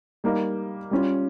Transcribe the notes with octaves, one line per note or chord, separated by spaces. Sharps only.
G3 A#3 D#4
G3 C#4 F4